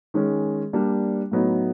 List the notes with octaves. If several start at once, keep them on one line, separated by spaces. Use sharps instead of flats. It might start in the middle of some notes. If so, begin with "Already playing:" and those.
D#3 G#3 C#4
G3 A#3 D4
A2 F#3 B3 D#4